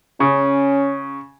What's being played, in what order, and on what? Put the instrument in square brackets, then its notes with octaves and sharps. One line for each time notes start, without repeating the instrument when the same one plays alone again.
[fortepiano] C#3 [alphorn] C#4